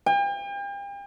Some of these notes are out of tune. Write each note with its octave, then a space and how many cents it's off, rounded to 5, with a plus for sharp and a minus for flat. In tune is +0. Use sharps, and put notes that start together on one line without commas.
G5 +40